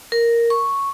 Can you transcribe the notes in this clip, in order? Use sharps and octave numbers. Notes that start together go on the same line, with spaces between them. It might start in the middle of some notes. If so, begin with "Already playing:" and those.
A#4
C#6